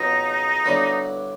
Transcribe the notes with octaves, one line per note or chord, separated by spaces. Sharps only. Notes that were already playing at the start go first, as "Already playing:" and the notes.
Already playing: F2 C#3 F#3 B3 D#4
G2 D3 F#3 B3 E4